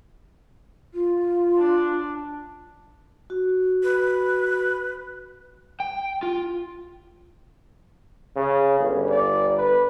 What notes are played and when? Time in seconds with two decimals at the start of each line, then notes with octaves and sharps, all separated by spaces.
0.94 F4
1.59 D4
3.30 F#4
3.83 B4
5.80 G5
6.23 F4
8.36 C#3
8.80 G1
9.10 D5
9.58 B4